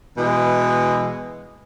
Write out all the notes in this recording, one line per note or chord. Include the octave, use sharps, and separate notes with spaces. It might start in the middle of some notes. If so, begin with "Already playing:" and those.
B2 E3 G#3